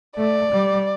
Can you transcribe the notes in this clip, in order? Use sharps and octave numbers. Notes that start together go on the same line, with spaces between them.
A3 D5
G3